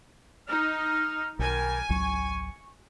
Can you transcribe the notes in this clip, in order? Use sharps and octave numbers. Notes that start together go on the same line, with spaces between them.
D#4 F6
B1 D#3 G3 A#4 G#5
G#1 C#2 F#3 C#6